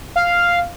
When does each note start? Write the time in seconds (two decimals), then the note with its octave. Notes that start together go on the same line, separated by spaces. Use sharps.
0.16 F5